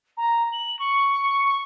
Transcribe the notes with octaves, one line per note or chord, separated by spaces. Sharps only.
A#5
F#7
C#6
C#6